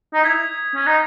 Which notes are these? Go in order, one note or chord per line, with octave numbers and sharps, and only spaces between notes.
D#4
E4 D#6 G#6 B6
C#4
D#4